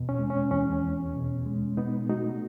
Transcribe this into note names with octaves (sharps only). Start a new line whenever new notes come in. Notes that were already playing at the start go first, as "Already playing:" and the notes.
Already playing: E2 B2
C#4
G#3
C#4
E2 C#4
E2
B2
G#3
B2 B3 D#4
A3 D#4 F#4